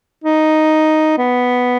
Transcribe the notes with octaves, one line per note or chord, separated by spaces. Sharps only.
D#4
B3